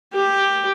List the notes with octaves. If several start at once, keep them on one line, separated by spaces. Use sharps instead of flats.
G4